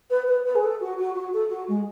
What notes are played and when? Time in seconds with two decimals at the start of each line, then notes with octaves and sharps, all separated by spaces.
0.10 B4
0.27 B4
0.45 B4
0.55 G#4
0.63 A4
0.80 F#4
0.98 F#4
1.15 F#4
1.33 A4
1.49 F#4
1.68 G#3